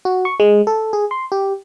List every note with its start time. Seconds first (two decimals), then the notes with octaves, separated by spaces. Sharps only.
0.05 F#4
0.25 C#6
0.40 G#3
0.67 A4
0.93 G#4
1.11 C6
1.32 G4